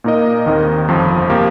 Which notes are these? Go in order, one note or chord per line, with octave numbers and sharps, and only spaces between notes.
A#2 A#3 D#4 A#4 D#5
D#2 D#3 C4 D#4 A#4
G1 F2 F3
C3 F3 A#3 G4